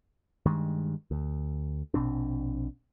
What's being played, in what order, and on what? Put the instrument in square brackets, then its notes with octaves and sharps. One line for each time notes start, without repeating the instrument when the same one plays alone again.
[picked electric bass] G2 D#3 G#3
D2
A#1 B2 C4 D4